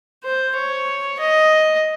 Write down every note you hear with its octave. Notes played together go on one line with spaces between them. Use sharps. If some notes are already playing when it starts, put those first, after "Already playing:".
C5
C#5
D#5